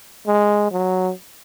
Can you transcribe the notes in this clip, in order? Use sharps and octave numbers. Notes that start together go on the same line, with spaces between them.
G#3
F#3